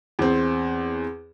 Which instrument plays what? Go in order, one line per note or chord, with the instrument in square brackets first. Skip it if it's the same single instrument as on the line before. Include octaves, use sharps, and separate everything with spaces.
[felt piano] E2 C4